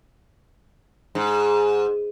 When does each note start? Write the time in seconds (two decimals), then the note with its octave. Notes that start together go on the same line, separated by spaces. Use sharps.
1.15 G#2